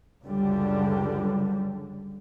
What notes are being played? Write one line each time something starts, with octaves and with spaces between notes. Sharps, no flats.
C#2 F#2 D3 G3